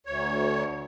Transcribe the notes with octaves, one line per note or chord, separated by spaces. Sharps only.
D2 C#5